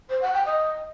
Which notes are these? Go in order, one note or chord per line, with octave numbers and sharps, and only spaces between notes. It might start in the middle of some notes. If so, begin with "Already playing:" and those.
C5
F#5
G5
D#5